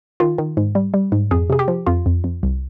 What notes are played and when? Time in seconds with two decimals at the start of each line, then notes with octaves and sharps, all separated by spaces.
0.20 D#3 F4
0.38 D#3
0.57 G#2
0.75 G3
0.94 G3
1.12 G#2
1.31 F2 G#4
1.50 C3 G#4
1.59 G4
1.68 F3
1.87 F2 F4
2.06 F2
2.24 F2
2.43 C2